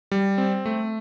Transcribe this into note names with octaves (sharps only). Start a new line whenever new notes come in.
G3
C4
A3